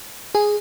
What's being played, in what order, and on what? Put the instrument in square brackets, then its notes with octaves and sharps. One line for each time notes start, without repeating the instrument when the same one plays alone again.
[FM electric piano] G#4